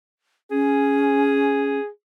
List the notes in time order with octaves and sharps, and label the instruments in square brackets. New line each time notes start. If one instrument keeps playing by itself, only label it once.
[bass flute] C#4 [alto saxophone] G#4